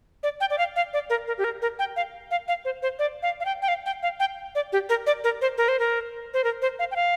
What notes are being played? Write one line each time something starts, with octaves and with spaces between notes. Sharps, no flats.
D5
G5
D5
F5
F5
D5
A#4
A#4
G4
A#4
A#4
G5
F5
F5
F5
C5
C5
D5
F5
F5
G5
G5
F5
G5
F5
G5
D5
G4
A#4
D5
A#4
C5
A#4
C5
A#4
C5
A#4
C5
F5
G5
F5